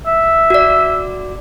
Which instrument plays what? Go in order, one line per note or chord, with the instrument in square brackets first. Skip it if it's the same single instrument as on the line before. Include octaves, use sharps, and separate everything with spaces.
[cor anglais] E5
[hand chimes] F#4 D5